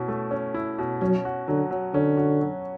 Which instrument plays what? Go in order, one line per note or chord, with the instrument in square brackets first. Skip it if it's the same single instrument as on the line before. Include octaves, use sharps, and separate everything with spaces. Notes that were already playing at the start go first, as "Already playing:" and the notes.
Already playing: [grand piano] B2 C#4 E4
A3
C#4
E4
B2
[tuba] F#3 [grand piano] C#4
[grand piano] F#4
[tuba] D3 [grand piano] F#3
[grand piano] F#3
[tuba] D3 [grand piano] C#4
[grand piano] F#4
F#3